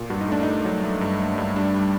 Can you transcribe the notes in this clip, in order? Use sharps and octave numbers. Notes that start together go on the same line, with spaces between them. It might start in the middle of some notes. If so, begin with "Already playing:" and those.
Already playing: A#2
G2 F#4
D#4
A3 D4
A3 D#4
F#3
A3
G2
A3
G2
G3 D4
G3